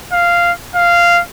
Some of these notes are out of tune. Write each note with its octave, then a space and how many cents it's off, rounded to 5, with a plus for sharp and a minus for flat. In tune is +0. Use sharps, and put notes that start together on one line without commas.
F5 -10
F5 -10